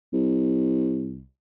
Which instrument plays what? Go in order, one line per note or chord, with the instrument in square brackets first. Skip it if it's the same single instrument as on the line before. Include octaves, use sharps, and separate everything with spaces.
[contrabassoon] C2